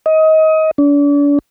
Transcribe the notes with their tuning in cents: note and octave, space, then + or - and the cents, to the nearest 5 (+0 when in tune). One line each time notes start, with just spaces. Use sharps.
D#5 +25
D4 -40